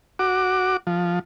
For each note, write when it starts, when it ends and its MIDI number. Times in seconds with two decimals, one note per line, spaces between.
0.19 0.77 66
0.19 0.77 86
0.87 1.19 53